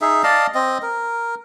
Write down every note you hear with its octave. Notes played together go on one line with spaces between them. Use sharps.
D#4 G#4 E5
D5 D#5 F5 A5
C4 D#5
A#4